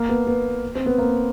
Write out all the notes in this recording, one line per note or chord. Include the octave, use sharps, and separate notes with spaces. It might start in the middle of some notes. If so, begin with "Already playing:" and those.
Already playing: A#3
B3
B3
C4
B3
A#3